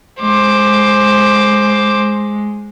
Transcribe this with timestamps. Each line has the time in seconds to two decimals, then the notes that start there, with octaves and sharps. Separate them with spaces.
0.20 G#3 C5 D6